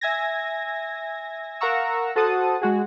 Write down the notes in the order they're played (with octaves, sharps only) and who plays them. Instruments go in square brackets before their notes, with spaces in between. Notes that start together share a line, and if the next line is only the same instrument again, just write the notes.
[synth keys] E5 G#5 G#6 A#6
A#4 F5 F#5 A#5 C#6 E6
F#4 A4 C5 F#5 A5 D#6
G#3 F#4 G#4